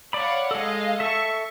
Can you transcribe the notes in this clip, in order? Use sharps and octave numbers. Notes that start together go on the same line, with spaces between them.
C#5 D5 F5 F#5 B5
G#3 A4 D#5 F5
A4 E5 C#6